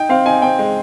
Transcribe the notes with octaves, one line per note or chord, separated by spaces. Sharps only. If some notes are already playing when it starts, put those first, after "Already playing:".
Already playing: D#4 G5
C4 F5
D#4 G#5
C4 G5
G#3